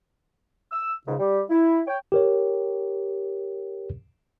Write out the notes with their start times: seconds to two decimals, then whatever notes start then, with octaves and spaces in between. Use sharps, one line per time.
0.72 E6
1.07 C#2 G#2 C#3
1.19 G3 G4
1.50 E4
1.87 C#5 G5
2.12 G4 A#4 C#5